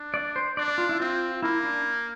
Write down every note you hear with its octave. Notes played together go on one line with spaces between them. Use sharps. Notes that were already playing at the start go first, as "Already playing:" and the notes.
Already playing: D4
D5
C5
D4 D5
D5
F4
E4
C4 F4
A#3 E4
D4